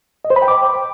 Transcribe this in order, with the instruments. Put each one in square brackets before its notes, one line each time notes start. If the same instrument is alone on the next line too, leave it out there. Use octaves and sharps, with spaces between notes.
[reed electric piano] D#5
C5
B5
G5
D6